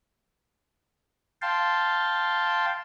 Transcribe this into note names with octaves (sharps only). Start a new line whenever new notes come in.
F5 G5 A5 C6